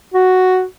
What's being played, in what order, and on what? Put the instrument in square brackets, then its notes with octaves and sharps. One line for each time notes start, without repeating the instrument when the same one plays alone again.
[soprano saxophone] F#4